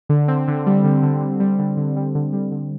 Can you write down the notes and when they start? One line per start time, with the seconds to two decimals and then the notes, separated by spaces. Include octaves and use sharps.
0.09 D3
0.28 C4
0.48 D3
0.66 G3
0.84 D3
1.03 D3
1.21 D3
1.40 G3
1.59 D3
1.77 D3
1.97 G3
2.15 D3
2.33 G3
2.51 D3